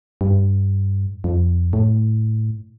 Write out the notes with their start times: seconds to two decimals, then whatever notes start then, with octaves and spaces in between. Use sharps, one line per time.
0.21 G2
1.24 F2
1.73 A2